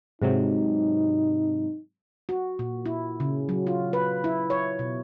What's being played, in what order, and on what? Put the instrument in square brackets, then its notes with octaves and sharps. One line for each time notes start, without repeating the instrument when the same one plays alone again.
[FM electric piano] G#2 C3 F#3 [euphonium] D#4
[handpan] F#4
A#2
E4
C#3
F#3
F4
B4
E4
C#5
B2